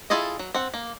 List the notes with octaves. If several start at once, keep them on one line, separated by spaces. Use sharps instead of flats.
E4 F4 G#4 A4 D#5
F#3
C4 F#5
A#3